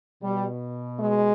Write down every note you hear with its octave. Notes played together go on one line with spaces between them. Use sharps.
B2 G3
G#3